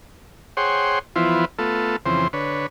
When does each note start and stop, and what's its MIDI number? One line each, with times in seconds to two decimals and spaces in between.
0.57 0.99 68
0.57 0.99 72
0.57 0.99 73
0.57 0.99 78
0.57 0.99 79
0.57 0.99 84
1.16 1.45 52
1.16 1.45 53
1.16 1.45 59
1.16 1.45 64
1.16 1.45 65
1.16 1.45 72
1.59 1.96 57
1.59 1.96 59
1.59 1.96 65
1.59 1.96 69
2.06 2.28 41
2.06 2.28 49
2.06 2.28 52
2.06 2.28 60
2.06 2.28 72
2.33 2.66 50
2.33 2.66 71
2.33 2.66 73